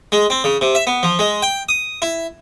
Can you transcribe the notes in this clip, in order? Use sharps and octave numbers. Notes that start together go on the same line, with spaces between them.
G#3
C4
C#3
C3
E5
B3
F3
G#3
G5
D#6
E4